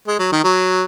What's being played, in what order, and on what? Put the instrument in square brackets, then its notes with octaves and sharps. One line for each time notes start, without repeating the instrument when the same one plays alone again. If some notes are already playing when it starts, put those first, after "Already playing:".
[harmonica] G#3
F#3
D#3
F#3